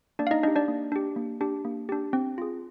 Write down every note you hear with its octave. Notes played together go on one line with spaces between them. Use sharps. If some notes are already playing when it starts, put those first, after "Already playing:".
A#3 D4 D5
F5
D#4 D#5
D4 D#4 G4 D#5
D4 D5
A#3
D4 G4
A#3
D4 G4
A#3
D4 G4
C4
F4 G#4